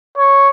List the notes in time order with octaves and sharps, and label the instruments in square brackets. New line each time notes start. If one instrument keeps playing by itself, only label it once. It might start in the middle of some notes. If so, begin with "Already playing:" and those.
[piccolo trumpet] C#5